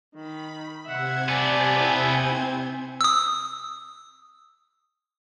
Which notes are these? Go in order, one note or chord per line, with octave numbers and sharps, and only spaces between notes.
D#3 B5
C3 C5 E5 F#5 G#6
B3 A4 D5 G#5
E4 G5
C4
D#6 E6